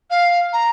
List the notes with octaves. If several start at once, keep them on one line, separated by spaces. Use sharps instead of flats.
F5
A#5